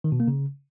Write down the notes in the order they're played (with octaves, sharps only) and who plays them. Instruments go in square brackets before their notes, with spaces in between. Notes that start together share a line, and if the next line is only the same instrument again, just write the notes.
[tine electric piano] D#3
B2
A#3
C#3